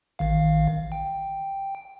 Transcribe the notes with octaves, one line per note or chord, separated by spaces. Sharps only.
A1 D#3 F5
G5